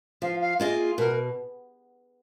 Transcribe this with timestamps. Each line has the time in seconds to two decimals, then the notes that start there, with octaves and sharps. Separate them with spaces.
0.22 F3 F5
0.40 F5
0.60 A#3 F4 G#4 D#5
0.98 B2 A#4